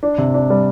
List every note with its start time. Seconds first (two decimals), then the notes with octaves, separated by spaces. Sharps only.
0.03 D4
0.18 C3
0.34 D4
0.50 G3